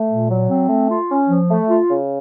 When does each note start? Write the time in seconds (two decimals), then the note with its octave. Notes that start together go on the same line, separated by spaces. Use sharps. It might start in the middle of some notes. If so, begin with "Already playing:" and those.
Already playing: A3
0.09 A#2
0.30 F#3
0.50 C4
0.69 A3
0.90 F4
1.10 C#4
1.29 F3
1.49 A3
1.69 F4
1.90 C#3